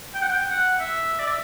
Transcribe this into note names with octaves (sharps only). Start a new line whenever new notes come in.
G5
F#5
G5
F#5
E5
D5
E5